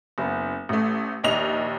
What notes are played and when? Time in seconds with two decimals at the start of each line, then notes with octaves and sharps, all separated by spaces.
0.18 F#1 B3
0.69 A1 A3
1.23 A#1 D#2 D#5 F7